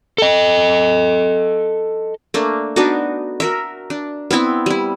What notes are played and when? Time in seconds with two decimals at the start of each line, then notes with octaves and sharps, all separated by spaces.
0.18 A4 D#5
2.34 A3 A#3 D4
2.76 B3 D4 D#4 F#4
3.40 F#4 A#4 E5
3.90 D4
4.31 B3 C4 E4 E5
4.66 G3 E4